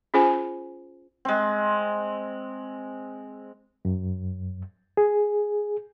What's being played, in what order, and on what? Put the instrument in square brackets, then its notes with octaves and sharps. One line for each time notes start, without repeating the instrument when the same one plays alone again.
[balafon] C#4 F4 G#4 C5 G#5
[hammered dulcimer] G#3 C4
[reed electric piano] F#2
G#4